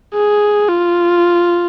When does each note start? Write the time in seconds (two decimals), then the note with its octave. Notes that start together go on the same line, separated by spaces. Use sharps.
0.14 G#4
0.69 F4